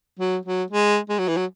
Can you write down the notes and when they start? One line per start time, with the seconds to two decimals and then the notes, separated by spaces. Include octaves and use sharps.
0.19 F#3
0.45 F#3
0.71 G#3
1.10 G#3
1.19 F#3
1.28 E3
1.37 F#3